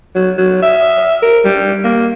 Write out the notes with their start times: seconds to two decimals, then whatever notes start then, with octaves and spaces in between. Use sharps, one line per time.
0.15 F#3
0.38 F#3
0.63 E5
1.22 A#4
1.45 G3
1.84 A#3